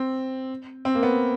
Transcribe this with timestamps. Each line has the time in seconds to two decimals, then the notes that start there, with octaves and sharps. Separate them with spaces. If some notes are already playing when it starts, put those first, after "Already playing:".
Already playing: C4
0.85 C4
0.95 A#3
1.03 B3